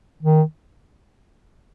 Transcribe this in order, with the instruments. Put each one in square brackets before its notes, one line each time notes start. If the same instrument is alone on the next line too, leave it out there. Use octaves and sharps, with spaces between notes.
[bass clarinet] D#3